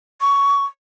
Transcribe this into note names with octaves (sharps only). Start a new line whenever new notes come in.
C#6